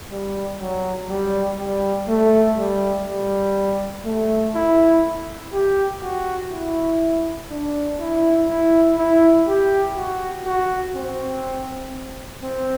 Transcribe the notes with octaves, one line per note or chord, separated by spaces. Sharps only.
G3
F#3
G3
G3
A3
G3
G3
A3
E4
G4
F#4
E4
D4
E4
E4
E4
G4
F#4
F#4
C4
C4